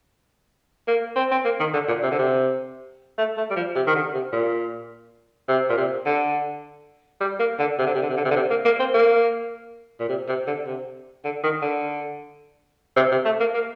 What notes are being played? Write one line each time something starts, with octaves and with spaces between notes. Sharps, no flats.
A#3
C4
C4
A#3
D#3
D3
A#2
C3
D3
C3
A3
A3
G3
F3
C3
D#3
D3
C3
A#2
C3
A#2
C3
D3
G3
A#3
D3
C3
D3
C3
D3
C3
D3
C3
D3
C3
A#3
A#3
C4
A#3
A#2
C3
C3
D3
C3
D3
D#3
D3
C3
C3
A3
A#3
A#3